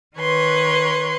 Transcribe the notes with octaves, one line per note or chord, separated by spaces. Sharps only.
D#3 B4 C#5 C6